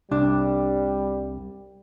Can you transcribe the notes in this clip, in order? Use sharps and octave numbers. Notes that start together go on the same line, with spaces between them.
C2 G3 D4